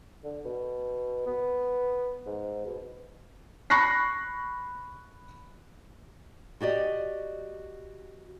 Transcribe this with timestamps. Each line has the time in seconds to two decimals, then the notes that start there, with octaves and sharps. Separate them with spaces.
0.24 D3
0.45 B2
1.26 B3
2.26 G#2
2.66 B2
3.70 B5 C#6 F#6 A#6 C7
6.61 F#4 G4 D5 D#5